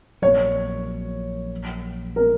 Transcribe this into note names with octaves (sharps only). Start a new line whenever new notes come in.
A#1 A#2 F#3 C#5
A#4